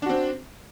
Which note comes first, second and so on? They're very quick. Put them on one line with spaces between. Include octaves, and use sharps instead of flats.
D4 F#4 C4